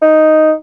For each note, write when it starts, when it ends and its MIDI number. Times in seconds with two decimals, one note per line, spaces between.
0.02 0.53 63